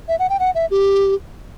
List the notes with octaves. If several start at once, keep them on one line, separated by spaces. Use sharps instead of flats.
E5
F#5
G5
F#5
E5
G4